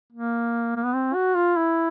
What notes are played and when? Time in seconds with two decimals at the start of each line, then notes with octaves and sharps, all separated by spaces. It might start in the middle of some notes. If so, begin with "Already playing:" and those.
0.13 A#3
0.77 A#3
0.85 B3
0.95 C4
1.15 F#4
1.35 F4
1.57 E4